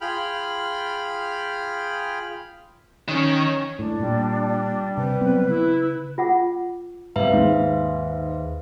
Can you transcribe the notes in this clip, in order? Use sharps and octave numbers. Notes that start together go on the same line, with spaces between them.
F4 G#4 G5 B5 F6
D#3 C#4 C#5
A2 D4
A#2 G3
C3 B4
F#3 B3 C4
C#3 E4
F4 F#5 D6
G#2 C3 G3 B4 E5 F5 A#5
D#2 G#2